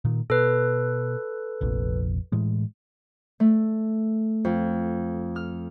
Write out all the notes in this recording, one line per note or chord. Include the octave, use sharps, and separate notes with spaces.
A#2 D#3
B2 A4 B4
F1 A#1 F2
A2 E3 G#3
A3
F2
F6